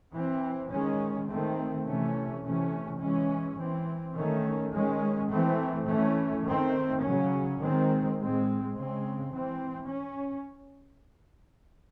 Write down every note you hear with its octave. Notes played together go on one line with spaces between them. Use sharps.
E3 C4
D#3 G#3 C#4
D#3 A3 C4
C3 E3 A3 C#4
C3 E3 A3 C#4
E3 G#3 C#4
E3 C4
D#3 A3 C#4
D#3 G#3 C#4
E3 A3 C4
E3 A3 C#4
D#3 A3 C4
C#3 F#3 C#4
D#3 G#3 C4
A2 G#3 C4
C#3 G#3 C4
E3 C4
C#4